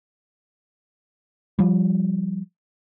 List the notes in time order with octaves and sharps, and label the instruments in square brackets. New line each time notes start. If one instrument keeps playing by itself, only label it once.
[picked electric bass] F3 G3